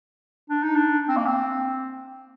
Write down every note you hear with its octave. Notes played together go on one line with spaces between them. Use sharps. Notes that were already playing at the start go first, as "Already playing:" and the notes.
D4
D#4
D4
C4
A#3
C4